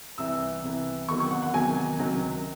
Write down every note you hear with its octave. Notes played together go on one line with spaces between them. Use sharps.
C2 C3 E3 E6
C2 C3 E3
E2 C3 D#3 F#3 C#6
C#6
F#5
F#5
E2 C3 D#3 F#3 G#5
C#2 C3 D#3 F#3